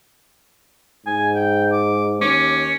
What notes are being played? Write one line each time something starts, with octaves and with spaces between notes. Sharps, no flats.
G#2 G#5
G5
D6
D#2 C#4 D6